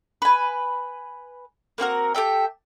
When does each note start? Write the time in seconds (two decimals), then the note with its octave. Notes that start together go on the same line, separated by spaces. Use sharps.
0.22 B4 G#5
1.78 A#3 C4 F#4 A#4
2.15 G4 A4 E5 G5